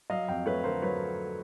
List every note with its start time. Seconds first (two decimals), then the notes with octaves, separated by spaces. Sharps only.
0.10 F#3 D#5 F5
0.28 F2 F5 G5
0.46 A3 B4 C#5
0.64 D3 A#4 C5
0.82 F#3 B4 C#5